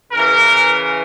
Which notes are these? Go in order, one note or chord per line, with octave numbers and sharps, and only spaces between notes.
C#3 E3 A#4